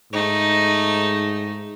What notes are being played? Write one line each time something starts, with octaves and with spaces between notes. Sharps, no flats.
G#2 A3 D#4